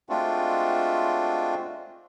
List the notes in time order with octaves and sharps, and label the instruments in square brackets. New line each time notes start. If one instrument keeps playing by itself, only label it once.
[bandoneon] G#3 A3 C4 D4 F4 F#4